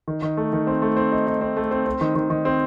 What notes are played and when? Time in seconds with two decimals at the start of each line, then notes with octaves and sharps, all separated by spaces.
0.08 D#3
0.22 D#3
0.37 A3
0.53 D#3
0.67 C4
0.82 A3
0.97 C4
1.12 D#4
1.27 D#4
1.41 C4
1.57 A3
1.71 C4
1.86 C4
2.01 D#3
2.15 D#3
2.30 D#3
2.45 C4